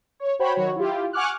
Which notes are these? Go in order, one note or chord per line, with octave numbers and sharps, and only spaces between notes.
C#5
F#4 C5 C#5 G5 B5
D#3 F#3 F#4 C#5
E4 F4 G4
F#5 G#5 C#6 D6 F6 F#6